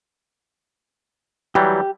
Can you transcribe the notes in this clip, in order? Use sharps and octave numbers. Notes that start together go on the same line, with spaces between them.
E3 F#3 G3 G4